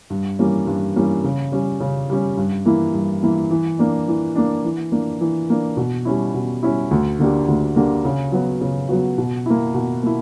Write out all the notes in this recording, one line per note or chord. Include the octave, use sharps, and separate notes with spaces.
G2
E3 G3 A#3 C#4
G2
E3 G3 A#3 C#4
C#3
G3 C#4
C#3
G3 C#4
G2
E3 A#3 E4
G2
E3 A#3 E4
E3
A#3 D4
E3
A#3 D4
E3
A#3 D4
E3
A#3 D4
B2
G3 C#4 E4
B2
G3 C#4 E4
D2
D3 A#3 D4 G4
D2
D3 A#3 D4 G4
C#3
F#3 B3 F#4
C#3
F#3 B3 F#4
B2
A#3 E4
B2
A#3 E4